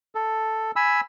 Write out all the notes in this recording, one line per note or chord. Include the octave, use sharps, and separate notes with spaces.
A4
G#5 B5 E6